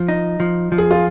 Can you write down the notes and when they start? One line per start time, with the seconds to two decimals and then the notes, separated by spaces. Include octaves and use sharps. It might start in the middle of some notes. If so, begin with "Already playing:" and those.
Already playing: F3
0.08 D#4
0.40 F3
0.72 F3
0.78 G#4
0.91 F4